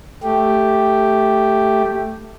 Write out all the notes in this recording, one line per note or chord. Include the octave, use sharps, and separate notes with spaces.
A3 G4